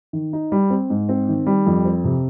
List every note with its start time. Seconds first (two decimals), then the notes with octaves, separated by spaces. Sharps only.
0.13 D#3
0.33 D#4
0.52 G3
0.70 C4
0.90 G#2
1.09 C4
1.29 D#3
1.47 G3
1.66 F2
1.85 C4
2.04 C3